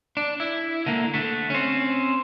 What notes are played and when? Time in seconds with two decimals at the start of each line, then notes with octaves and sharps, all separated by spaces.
0.17 D4
0.40 E4
0.86 D3 A#3
1.14 D3 A3
1.50 C4 C#4